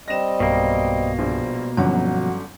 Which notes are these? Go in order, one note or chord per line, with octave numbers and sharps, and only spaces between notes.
G3 C4 D#5 A#6 E7
B1 G2 B2 A#3
A#1 G3 C5
G1 D3 F3 F#3 C#4 F#4 F#5